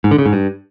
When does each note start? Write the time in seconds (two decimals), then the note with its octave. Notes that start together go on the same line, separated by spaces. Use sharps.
0.04 G#2
0.11 D3
0.18 C#3
0.26 G#2
0.33 G2